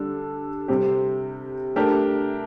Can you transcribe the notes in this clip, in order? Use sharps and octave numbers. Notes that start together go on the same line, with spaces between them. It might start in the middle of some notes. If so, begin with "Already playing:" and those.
Already playing: D3 G3 D4 A4
C3 G3 C4 G4
A3 D4 G4 A#4